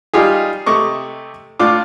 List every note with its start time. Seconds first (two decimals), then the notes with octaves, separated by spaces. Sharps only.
0.14 G3 D#4 F4 G4 G#4
0.66 C3 A3 D#5 C#6 D6
1.59 A2 D4 F4 D6